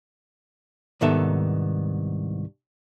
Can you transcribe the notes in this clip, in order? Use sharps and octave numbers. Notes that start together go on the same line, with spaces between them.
C2 G#2 D#3 B3 A4 E5